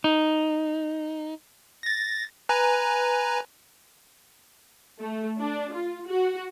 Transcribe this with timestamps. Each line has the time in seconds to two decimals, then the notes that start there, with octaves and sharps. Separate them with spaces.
0.04 D#4
1.83 A6 A#6
2.49 B4 G#5 A#5
4.99 A3
5.37 D4
5.72 F4
6.06 F#4